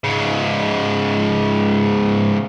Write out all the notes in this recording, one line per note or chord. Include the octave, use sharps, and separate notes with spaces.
G#2 C#3